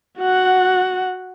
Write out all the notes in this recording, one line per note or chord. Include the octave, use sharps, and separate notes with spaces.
F#4 F#5